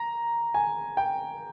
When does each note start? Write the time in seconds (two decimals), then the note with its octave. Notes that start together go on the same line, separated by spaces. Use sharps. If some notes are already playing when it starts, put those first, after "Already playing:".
Already playing: A#5
0.54 G#5
0.97 G5